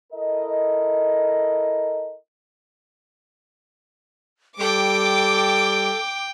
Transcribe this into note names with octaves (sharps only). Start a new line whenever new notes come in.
E4 A4 A#4 D#5
G3 A4 G5 D6